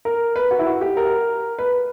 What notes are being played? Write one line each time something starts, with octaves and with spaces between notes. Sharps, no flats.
A#4
B4
F#4
E4
F#4
G4
A#4
B4